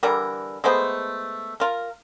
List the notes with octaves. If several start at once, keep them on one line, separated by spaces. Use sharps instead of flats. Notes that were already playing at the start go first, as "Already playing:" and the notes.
D3 E3 G3 A#4
G#3 A3 B3 C5
F4 A#4